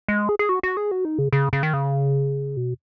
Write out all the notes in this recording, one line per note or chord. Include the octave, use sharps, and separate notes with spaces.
G#3
G#4
G#4
F#4
F#4
G#4
F#4
D#4
C#3
C#3
C#3
D#3
C#3
B2